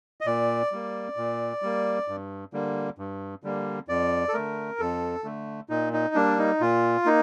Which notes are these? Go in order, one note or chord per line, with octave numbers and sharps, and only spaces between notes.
D#5
A#2 D5
G3 A#3
A#2
G3 A#3
G2
D3 G3 A#3
G2
D3 G3 A#3
F2 D5
A4
D3 A3 A#4
F2 A4
D3 A3
A#2 D#4
D#4
G3 A#3 D4
D#4
A#2 F4
A#3 D#4